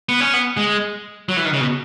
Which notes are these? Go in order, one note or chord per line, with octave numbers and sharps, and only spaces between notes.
B3
C#4
B3
G#3
F#3
E3
D#3
C#3
B2